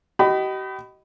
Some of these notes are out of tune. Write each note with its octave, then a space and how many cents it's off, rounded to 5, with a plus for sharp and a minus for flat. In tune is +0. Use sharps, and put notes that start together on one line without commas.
G4 -40 D#5 +0 B5 +15